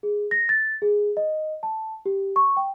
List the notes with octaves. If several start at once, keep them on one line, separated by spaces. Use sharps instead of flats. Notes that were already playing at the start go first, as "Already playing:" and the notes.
G#4
A#6
A6
G#4
D#5
A5
G4
C#6
G5